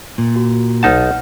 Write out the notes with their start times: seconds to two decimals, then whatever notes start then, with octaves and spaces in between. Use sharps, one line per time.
0.18 A#2
0.36 F#4
0.83 B1 D#4 F#5 A5 F6